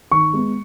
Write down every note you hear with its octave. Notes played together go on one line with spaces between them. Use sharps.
D#3 C#6
G#3 B3